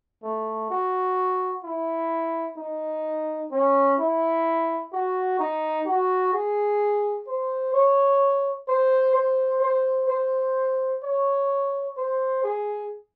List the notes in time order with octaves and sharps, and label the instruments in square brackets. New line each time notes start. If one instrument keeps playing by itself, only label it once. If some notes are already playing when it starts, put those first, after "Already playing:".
[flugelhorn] A3
F#4
E4
D#4
C#4
E4
F#4
D#4
F#4
G#4
C5
C#5
C5
C5
C5
C5
C#5
C5
G#4